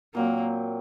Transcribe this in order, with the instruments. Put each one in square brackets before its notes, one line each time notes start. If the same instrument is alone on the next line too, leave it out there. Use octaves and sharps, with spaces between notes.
[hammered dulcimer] A#2 F#3 C4 [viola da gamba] A#3